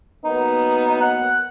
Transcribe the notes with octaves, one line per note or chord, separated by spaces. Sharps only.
F#3 A#3 B3 D#4
F#5